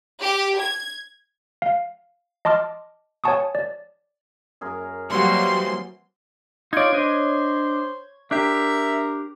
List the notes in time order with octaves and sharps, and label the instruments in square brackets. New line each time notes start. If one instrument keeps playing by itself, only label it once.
[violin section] G4
G#6
[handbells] F5
D#5 A5 C6 D6 F6
C#5 F#5 G#5 A5 C#6 D#6
D5
[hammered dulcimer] F#2 G#4 A#4
[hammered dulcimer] E3 C4 F#4 [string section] F#3 G3 A#3 [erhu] C6
[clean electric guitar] D#4 D5 [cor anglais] F4 [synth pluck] C#5 G#6
[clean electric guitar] D4 D#5 [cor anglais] C5
[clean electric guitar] D4 G4 [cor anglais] A#4 [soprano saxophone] E5